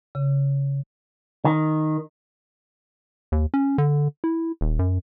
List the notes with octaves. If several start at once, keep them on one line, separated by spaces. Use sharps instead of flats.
C#3
D#3
D#2
C#4
D3
E4
D#1
F#2